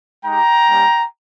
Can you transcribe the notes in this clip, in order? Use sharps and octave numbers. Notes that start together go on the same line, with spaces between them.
G#3 D#4 G4 G5 A#5
G3 A#3 C#4 G4